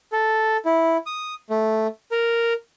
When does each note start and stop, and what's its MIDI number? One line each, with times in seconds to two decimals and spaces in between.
0.12 0.57 69
0.65 0.97 64
1.06 1.34 87
1.50 1.87 57
2.12 2.53 70